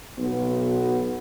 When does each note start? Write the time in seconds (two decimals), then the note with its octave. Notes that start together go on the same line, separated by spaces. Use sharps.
0.18 B1 B3